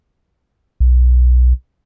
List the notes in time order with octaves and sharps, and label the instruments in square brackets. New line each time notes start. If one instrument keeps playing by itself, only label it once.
[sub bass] B1